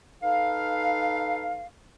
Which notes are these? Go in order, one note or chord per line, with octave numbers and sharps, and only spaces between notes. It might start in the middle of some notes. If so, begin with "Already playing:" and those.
D#4 A4 B4 F5